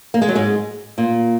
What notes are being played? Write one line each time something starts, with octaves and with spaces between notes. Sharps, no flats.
A#3
G#3
F#3
G#2 G#3
A#2 A#3